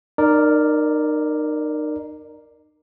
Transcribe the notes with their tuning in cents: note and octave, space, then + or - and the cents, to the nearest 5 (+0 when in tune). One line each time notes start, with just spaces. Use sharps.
D#4 -35 A#4 +0 D5 +0